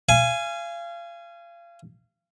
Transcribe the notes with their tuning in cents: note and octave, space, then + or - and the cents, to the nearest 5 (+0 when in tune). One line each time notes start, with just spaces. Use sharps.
F5 -30 G#5 +0